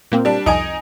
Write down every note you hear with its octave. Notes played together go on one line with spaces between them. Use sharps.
A#2 A#3 C4
G3 D4
C2 F2 D#4 D#5 G#5 D7